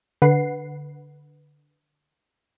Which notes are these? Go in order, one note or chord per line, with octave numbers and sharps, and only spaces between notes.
D3 B4 F#5 C7